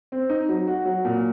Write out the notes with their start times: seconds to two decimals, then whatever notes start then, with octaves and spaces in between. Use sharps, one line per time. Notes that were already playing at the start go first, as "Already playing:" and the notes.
0.12 C4
0.30 D#4
0.49 F#3
0.67 F#4
0.85 F#3
1.05 A#2